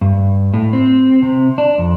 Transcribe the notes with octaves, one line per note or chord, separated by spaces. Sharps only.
G2
A2
C4
C3
D4
F2